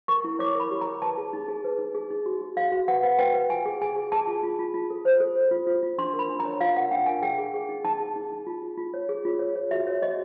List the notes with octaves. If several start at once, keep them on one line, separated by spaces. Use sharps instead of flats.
A#4 C#6
E4
C#5 D6
A#4 B5
G4
A#5
C#5
B4 A5
G#4
D#4
G#4
B4
D#4
G#4
D#4
F#4
F#4
F#4 F5
F#4
B4 F#5
B4
B4 G5
B4
F4 G#5
G#4
G#4 G#5
G#4
G#4 A5
F4
F4
F4
F4
A4
C5
A4
A4
F4
F4
F4
D4 C6
A#4
B5
D4
A#5
C#5
F4 F5
A#4 F#5
D4 G5
A#4 G#5
G#4 G5
G#4
G#4
D#4
D#4 A5
G#4
D#4
D#4
F4
F4
F4
C#5
G#4
F4
C#5
C#5
F#4 E5
C#5
F#4 D#5